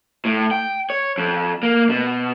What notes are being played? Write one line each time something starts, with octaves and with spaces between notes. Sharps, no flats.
A2
G5
C#5
F2
A#3
B2